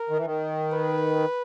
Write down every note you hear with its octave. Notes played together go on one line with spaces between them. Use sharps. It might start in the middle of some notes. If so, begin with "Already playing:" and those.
Already playing: A#4
D#3
E3
D#3
B4